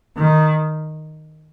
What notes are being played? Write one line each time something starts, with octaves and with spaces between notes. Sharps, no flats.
D#3